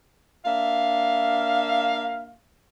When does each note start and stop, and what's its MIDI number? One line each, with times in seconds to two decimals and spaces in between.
0.45 2.35 58
0.45 2.35 62
0.45 2.35 76
0.45 2.35 77